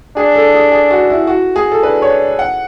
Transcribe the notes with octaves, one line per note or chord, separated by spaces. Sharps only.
D4 G#4
A4
G#4
G#4
F#4
E4
F#4
G#4
A4
D4 B4
C#5
F#5